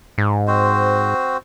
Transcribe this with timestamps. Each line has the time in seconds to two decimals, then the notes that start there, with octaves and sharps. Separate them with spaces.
0.18 G#2
0.47 C4 F#4 C5